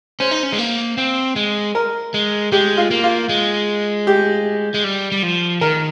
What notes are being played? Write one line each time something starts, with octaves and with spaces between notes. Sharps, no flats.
C#4 C5
D#4
C#4
G#3
A#3
C4
G#3
A#4
G#3
G#3 G4
F4
A#3
F4
G#3
G4
G#3
G3
G3
F3
D#3 A#4